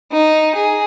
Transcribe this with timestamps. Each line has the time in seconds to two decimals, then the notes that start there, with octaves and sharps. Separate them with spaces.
0.12 D#4
0.55 G#4